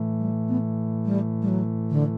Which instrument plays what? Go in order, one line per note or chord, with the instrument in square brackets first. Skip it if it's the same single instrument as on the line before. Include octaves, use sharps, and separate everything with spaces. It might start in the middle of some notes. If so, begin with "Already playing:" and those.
Already playing: [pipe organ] A2 E3 A3
[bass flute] G3
B3
G3
G3
F#3
D3